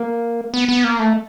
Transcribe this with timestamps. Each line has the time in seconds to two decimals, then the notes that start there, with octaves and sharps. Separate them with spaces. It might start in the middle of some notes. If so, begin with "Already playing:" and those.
Already playing: A#3
0.54 B3
0.69 B3
0.84 A#3
0.99 A3